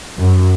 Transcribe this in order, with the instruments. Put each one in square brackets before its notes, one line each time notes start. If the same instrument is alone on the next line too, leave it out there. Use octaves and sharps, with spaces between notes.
[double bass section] F#2